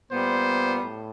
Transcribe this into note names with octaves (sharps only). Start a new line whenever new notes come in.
A#2 G3 B3 C5
A2